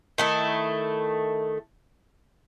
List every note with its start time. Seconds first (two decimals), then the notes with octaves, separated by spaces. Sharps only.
0.18 D#3 A3 E4